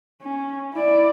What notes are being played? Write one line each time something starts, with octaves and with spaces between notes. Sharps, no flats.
C#4
E4 D5